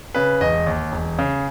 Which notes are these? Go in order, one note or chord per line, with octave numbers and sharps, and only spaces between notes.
C#3 B4
E1 D#5
D#2
E1
C#3